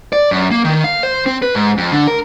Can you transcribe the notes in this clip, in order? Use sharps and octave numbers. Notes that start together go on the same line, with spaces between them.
D5
F#2
A#3
D#3
F5
C5
C4
B4
G#2
F2
D3
A#4